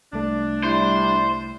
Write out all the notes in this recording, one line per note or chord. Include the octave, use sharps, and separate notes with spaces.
C2 A3 D4
G3 E4 C5